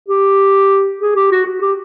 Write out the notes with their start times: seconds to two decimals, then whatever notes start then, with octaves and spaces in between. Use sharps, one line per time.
0.08 G4
1.01 G#4
1.16 G4
1.32 F#4
1.46 F#4
1.62 G4